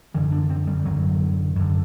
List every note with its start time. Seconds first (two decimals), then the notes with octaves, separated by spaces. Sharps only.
0.14 F#2 D3 E3
0.32 D4
0.49 C4
0.67 G3
0.85 F#2 D3 F#3
1.55 F#2 D3